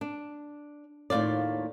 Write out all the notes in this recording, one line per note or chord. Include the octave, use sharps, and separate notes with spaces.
D4
D#2 A2 D#3 F4 D5